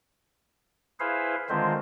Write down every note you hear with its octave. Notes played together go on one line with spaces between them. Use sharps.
E4 G#4 B4 C5 E5 F5
D3 D#3 G#3 C4 F4 C5